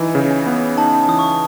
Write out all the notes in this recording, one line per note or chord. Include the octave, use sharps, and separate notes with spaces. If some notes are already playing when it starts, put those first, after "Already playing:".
Already playing: E3 D#4
C#3
G#5
B3
D#4 A5
E3 D#6
C#6
D#6